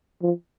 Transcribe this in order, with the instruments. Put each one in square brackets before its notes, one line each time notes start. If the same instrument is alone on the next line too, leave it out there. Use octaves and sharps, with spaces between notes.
[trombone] F3